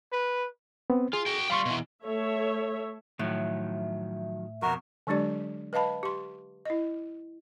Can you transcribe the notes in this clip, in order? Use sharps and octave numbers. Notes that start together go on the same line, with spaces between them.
B4
B3 C4
F4 G#4
F#4 G5
G3 F4 F5 C6 C#6
B2 E3
A3 A4 C#5 E5
A2 D#3 F3 F#3 E5
F2 B2 F#4 A#4
D3 F#3 G#3 D4 G4 D5
B4 D#5 F5 A5 B5
G4 C6
E4 D#5